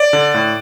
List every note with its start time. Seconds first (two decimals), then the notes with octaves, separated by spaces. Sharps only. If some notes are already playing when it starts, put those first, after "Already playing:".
Already playing: D5
0.13 D3
0.34 A2